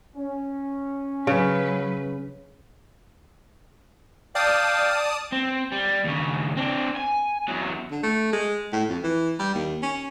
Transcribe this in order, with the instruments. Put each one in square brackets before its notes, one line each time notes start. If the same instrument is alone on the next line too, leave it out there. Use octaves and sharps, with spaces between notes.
[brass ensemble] C#4
[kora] C#3 [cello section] F#3 B4
[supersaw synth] D5 A5 D#6 [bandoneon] F5 G5
[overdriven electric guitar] C4
G3
D#2 C#3
C4 D4
G#5
E2 F#3
[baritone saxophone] D3
A3
G#3
A2
F2
E3
G3
D#2
C#4